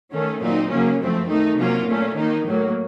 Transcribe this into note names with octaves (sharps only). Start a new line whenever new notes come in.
D#3 A3 C#4
A#2 F#3 C4 D#4
C#3 F#3 A#3 C#4
F#2 F3 A3 C4
D#3 A3 D#4
C3 F#3 A#3 C#4 F4
A#2 A3 C#4
D#3 A#3 D#4
A2 F#3 A#3